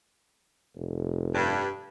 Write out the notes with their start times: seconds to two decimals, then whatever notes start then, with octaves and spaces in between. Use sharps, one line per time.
0.76 F1
1.35 G2